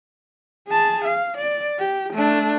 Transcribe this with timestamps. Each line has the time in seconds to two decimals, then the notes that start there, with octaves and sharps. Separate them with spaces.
0.68 G#4 A5
1.05 F5
1.37 D5
1.79 G4
2.13 A3 D4